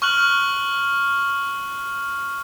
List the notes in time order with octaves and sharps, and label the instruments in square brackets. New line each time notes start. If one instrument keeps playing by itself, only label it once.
[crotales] C#6 F6 F#6 F#7